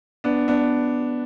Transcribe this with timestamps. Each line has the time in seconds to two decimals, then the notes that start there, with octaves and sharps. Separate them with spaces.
0.24 B3 D4
0.48 B3 D4